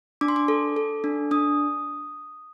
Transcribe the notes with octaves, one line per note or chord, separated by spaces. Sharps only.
D4 D6
C6
D6
A4
A4
D4
D4 D#6